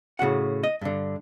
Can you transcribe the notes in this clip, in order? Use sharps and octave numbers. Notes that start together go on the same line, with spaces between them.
A2 C#3 F#4 F#5
D#5
G2 D3